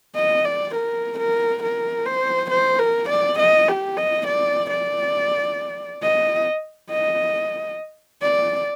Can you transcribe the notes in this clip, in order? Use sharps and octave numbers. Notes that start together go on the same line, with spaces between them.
D#5
D5
A#4
A#4
A#4
C5
C5
A#4
D5
D#5
G4
D#5
D5
D5
D#5
D#5
D5